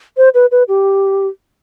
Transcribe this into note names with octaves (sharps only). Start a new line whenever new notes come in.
C5
B4
B4
G4